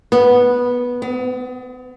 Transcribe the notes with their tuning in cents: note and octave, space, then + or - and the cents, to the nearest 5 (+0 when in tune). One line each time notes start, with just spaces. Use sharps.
B3 -10
B3 +40